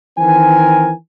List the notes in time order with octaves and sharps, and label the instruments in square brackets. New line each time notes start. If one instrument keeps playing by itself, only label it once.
[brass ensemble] D#3 E3 C4 A#4 G#5